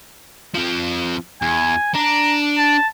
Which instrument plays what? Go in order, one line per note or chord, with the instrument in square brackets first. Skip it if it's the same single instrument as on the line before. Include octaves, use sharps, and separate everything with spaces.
[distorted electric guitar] F3 C4
[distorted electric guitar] E2 [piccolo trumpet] G#5
[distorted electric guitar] D4 [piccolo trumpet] A#5
[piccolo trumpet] A5